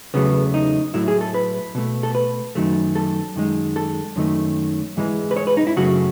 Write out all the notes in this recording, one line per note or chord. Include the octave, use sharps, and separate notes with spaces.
E2 C#3 F#3 A3 B3
D#4
A2 F#3 A3 E4
G#4
A4
B4
B2 A3
A4
B4
F#2 D#3 F#3 A3
A4
F#2 D#3 G#3
A4
F#2 D#3 A3
G#2 E3 G#3
B4
C#5
B4
D#4
E4
F#2 C#3 F#3 A3 F#4